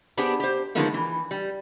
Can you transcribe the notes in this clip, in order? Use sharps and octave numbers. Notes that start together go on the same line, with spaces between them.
B3 D4 G4 G#4 C5
G4 C5
D3 D#3 F3 G#3 A#3 B3
E3
G3